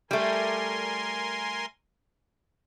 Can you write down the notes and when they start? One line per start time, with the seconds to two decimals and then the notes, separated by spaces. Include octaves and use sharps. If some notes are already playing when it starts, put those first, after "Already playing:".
0.11 G3 A3 A#4 G#5 C6